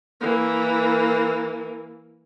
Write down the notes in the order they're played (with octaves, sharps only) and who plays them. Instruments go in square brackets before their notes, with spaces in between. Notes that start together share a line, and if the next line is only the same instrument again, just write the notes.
[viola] E3 A#3